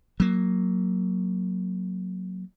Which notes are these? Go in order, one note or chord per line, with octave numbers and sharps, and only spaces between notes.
F#3 A#3